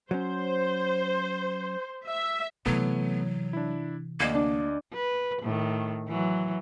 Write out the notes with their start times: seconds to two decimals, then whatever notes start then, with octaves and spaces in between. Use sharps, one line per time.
0.11 F#3 C#4 C5
2.06 E5
2.66 C3 E3 F#3 A3 B3
3.53 D4 E4
4.20 D2 A#3 D5 D#5
4.34 D4
4.94 B4
5.42 A2 D#3
6.09 E3 F#3